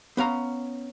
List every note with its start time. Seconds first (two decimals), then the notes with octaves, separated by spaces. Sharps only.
0.17 B3 C#4 F5 A#5